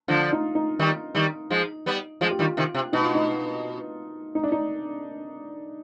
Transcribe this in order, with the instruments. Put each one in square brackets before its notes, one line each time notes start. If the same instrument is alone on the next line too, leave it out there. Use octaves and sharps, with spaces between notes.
[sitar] D3 F3 [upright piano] F4
[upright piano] D#4
D#4
[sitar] D#3 G3
D#3 G3
F3 G#3
G3 B3
[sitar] F3 G#3 [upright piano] F4
[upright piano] G4
[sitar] D#3 G3 [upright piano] F4
[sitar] C3 D#3
C3
[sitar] B2 [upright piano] D#4
[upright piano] F4
D#4
D#4
D4
D#4